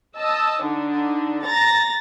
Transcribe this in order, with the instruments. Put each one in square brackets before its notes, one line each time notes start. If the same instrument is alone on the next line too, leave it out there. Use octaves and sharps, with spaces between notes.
[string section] D#5 A5 E6
D3 D4 D#4
A#5 A6 A#6